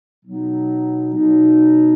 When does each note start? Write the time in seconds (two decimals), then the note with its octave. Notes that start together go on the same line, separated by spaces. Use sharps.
0.23 B2 F#3 B3 D#4
1.15 B2 F#3 B3 D#4